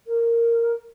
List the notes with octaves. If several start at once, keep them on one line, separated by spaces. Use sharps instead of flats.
A#4